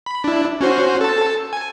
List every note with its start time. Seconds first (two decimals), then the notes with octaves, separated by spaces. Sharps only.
0.06 B5
0.24 D4 E4
0.61 C#4 F#4 C5
1.01 A4 A5
1.53 G#5